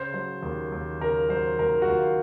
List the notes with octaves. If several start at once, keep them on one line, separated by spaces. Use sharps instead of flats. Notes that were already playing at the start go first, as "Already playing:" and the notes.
Already playing: C#3 C5
F#3
D#2
D#2
C#3 A#4
F#3 C5
D#2 A#4
F#4
D#2 F4